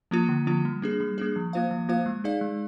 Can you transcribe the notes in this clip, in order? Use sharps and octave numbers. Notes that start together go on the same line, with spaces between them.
F3 A#3 F4
D3
F3 A#3 F4
G3
A#3 D4 G#4
G3
A#3 D4 G#4
F3
A#3 F4 C5 F5
F3
A#3 F4 C5 F5
G#3
D#4 G#4 D5 F5
G#3